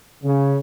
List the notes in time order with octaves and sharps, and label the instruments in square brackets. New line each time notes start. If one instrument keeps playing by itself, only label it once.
[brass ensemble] C#3